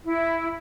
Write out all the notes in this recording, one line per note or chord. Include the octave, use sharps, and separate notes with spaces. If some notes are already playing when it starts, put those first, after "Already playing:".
E4